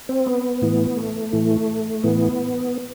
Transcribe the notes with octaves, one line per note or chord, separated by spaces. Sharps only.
C4
B3
A2 E3
A3
A2 E3
A2 E3 B3